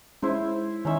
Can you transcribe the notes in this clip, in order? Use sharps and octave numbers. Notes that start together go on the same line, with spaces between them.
G#3 C#4 E4 C5
D#3 C#4 D#4 E5